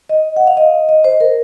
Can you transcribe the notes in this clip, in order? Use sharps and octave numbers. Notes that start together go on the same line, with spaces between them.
D#5
F#5
F5
D#5
D#5
C5
A#4